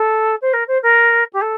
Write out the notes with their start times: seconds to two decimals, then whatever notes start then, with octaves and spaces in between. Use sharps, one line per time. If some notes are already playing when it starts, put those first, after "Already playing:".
Already playing: A4
0.41 C5
0.53 A#4
0.67 C5
0.82 A#4
1.33 G4
1.41 A4